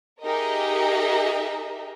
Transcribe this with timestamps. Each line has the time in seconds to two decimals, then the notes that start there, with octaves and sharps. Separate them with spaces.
0.22 D#4 G4 G#4 A#4 D#5 E5